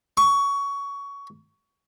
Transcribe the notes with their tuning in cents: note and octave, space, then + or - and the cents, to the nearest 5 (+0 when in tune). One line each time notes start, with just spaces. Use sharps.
C#6 +20